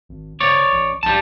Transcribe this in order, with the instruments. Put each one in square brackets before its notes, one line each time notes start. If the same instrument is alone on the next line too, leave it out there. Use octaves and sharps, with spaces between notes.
[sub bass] G#1
[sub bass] F#1 [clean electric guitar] C#5 D5
[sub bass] A1
[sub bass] A#1 [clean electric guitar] G3 A5